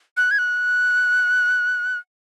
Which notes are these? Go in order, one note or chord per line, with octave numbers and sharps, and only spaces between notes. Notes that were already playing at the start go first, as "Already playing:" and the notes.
F#6
G#6
F#6